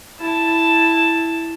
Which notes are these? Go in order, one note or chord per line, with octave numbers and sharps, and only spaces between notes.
E4 A5